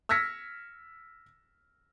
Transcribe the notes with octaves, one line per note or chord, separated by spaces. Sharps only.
E6 F6 G#6 A#6 B6 C#7